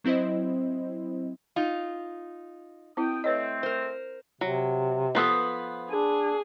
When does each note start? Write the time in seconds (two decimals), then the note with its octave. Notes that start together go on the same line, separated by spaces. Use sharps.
0.04 F#3 C4 E4 C5 D#5
1.56 D#4 F4
2.97 B2 C4 E4 G5 D#6
3.24 A3 C4 B4 C#5 D#5
3.63 A#4 C5
4.41 C3 F#3
5.15 F3 B3 A4 B4 C5 D#6
5.90 D4 G#4